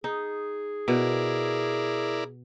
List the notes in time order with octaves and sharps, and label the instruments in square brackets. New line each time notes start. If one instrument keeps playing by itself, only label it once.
[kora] D#4 [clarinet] G#4
[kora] B2 [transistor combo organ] E4 A#4 D5